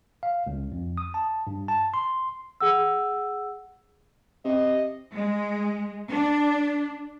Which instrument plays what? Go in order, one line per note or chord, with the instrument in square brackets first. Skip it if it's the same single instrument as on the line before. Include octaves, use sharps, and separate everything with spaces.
[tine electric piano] F5
C#2
F2
D#6
A5
G2
A5
C6
[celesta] G#4 F#5 E6
[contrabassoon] C3 [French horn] D#5
[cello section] G#3
D4